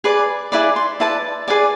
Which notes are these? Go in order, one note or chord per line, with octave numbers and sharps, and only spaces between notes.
G#4 B4 D5 B5
E4 G#4 B4 D5 B5
C6
E4 B4 D5 A5
G#4 B4 D5 G#5